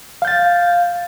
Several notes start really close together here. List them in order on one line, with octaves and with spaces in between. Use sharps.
F5 G6 A6